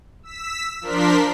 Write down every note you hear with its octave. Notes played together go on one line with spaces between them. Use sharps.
E6 B6
F3 D4 A#4 C6 B6